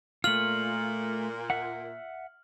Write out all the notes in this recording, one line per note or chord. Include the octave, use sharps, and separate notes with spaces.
A#2 A3 F4 F6 F#7
E5 F#5